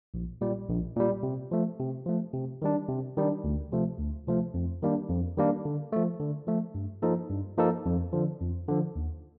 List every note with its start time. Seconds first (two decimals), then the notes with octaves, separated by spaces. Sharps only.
0.14 A#1
0.41 A#2 G3
0.69 A#1
0.96 A#2 G3
1.23 C3
1.51 F3 A3
1.79 C3
2.06 F3 A3
2.34 C3
2.62 D#3 G3 D4
2.89 C3
3.17 D#3 G3 D4
3.44 D2
3.72 C3 F3 A3
3.99 D2
4.27 C3 F3 A3
4.54 F2
4.82 D#3 G3 A#3 D4
5.10 F2
5.37 D#3 G3 A#3 D4
5.65 D3
5.92 F3 A3
6.20 D3
6.47 F3 A3
6.75 G2
7.02 F3 A#3 D#4 A4
7.30 G2
7.58 F3 A#3 D#4 A4
7.86 F2
8.13 D3 F3
8.40 F2
8.68 D3 F3
8.96 D#2